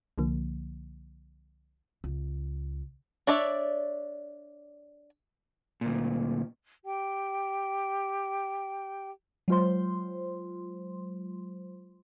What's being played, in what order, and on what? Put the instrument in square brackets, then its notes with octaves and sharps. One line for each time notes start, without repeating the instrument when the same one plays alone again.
[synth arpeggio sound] C2 D3 F3 A#3
[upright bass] C#2
[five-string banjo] D4 C#5 D5 E5
[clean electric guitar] D2 A#2
[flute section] G4 G5
[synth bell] F#3 G#3 F4 C5 C6